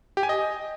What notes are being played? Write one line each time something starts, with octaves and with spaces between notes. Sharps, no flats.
G4
G#5
D#5